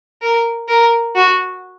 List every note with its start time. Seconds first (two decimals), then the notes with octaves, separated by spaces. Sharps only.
0.22 A#4
0.68 A#4
1.15 F#4